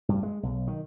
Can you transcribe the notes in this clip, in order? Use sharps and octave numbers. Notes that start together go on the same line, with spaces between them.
G2
G#3
B1
D#3